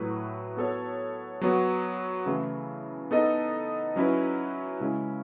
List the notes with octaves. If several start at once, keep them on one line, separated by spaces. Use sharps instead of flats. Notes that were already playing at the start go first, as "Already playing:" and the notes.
Already playing: A2 F#3 A3 E4 B4
B3 F#4 A4 C#5
F#3 B3 F#4
C#3 E3 A3 E4
B3 D#4 A4 D#5
F#3 C#4 E4 B4
C#3 G#3 C#4 E4